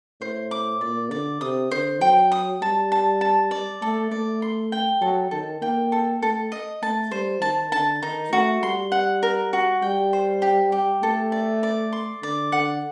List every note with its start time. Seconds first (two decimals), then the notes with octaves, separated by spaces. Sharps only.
0.21 A2 C5
0.51 D6
0.81 A#2 D5
1.11 D3 D5
1.41 C3 D#6
1.71 D3 C5
2.01 F#3 G5
2.32 D#6
2.61 G3 A5
2.92 A5
3.21 A5
3.51 D5
3.82 A3 A4
4.11 A3 D5
4.42 C6
4.72 G5
5.01 F#3 A4
5.31 D#3 A4
5.61 A#3 G5
5.92 A4
6.22 A3 A4
6.52 D#5
6.82 A3 A5
7.11 G3 C5
7.42 D#3 A5
7.72 D3 A5
8.03 D#3 D#4
8.32 A3 F#4
8.62 G3 C6
8.92 F#5
9.23 A#4
9.53 F#4
9.82 G3 G5
10.13 C5
10.42 G4
10.72 G4
11.02 A3 A4
11.32 D5
11.63 D5
11.93 C6
12.22 D3 D5
12.52 D3 F#5